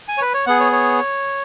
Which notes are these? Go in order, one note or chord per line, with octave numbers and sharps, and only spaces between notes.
G#5
C#5
B4
C#5
B3 G#4 F#5
C#5
C#5